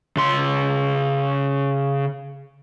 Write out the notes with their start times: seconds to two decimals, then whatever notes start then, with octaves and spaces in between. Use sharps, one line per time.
0.17 C#3 C6